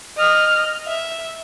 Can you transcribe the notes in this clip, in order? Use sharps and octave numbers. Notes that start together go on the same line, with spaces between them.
D#5 F6
E5